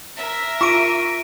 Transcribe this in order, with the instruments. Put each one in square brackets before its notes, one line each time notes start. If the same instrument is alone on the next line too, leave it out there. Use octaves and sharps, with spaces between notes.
[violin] A#4 E5
[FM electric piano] F4 [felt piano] C#6 [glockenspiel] A#6 D7 D#7